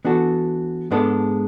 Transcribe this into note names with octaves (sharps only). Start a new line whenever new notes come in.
E3 B3 D4 F#4 A4
G#2 G#3 B3 D4 A4